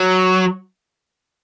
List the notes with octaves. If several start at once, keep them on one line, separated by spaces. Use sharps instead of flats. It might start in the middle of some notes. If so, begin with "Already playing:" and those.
Already playing: F#3